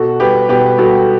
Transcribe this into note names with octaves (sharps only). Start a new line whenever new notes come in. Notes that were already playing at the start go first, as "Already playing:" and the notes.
Already playing: B2 F#4 A4
G3 G4 B4
B2 G4 B4
G3 F#4 A4